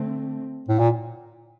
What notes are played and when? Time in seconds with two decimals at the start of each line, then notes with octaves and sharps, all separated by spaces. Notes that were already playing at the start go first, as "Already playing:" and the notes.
Already playing: D3 A3 C4
0.69 A2
0.79 A#2